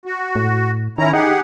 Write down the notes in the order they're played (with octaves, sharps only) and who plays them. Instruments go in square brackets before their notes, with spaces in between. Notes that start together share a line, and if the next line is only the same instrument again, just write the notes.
[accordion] F#4
[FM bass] A2
[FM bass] D#3 [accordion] C#4 E4 A#5
[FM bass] D#4 [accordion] G4 G#4 F#5